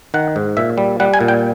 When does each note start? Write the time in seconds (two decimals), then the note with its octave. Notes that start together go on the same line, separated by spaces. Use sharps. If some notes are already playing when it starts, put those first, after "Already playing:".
0.14 D#3 F#5
0.36 G#2
0.57 A#2 E5
0.78 G3
1.00 G3 F#5
1.14 G#5
1.21 A#2
1.28 G5